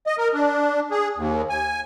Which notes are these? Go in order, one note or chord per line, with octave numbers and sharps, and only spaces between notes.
D#5
A#4
D4
G#4
D#2
G#5